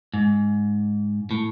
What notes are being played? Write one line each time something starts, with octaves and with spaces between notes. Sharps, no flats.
G#2
A2